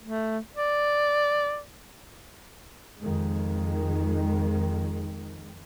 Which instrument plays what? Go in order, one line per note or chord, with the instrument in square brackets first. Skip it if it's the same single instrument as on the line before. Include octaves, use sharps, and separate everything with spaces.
[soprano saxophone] A3
D5
[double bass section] F2 D#3 G#3